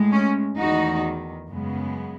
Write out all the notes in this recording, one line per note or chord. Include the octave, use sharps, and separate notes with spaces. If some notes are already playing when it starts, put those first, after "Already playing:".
Already playing: A2 G#3
C#4
E2 D#3 A3 D#4 F#4
F#2 C#3 G#3 B3